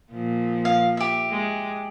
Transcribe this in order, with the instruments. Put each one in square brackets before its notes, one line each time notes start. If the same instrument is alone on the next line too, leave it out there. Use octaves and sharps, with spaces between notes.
[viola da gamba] A#2 F3
[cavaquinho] F5
G4 E5
[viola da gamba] G#3